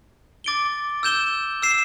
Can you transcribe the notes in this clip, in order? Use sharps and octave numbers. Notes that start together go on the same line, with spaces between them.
D6 A6 D7 G7
E6 G6 E7 G7
E6 C7 E7